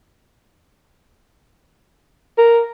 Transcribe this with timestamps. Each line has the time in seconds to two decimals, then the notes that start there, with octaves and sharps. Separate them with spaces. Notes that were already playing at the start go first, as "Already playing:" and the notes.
2.38 A#4